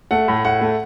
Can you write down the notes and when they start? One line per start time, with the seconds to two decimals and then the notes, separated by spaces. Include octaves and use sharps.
0.11 A3 F#5
0.28 A2
0.45 A2 F#5
0.61 A3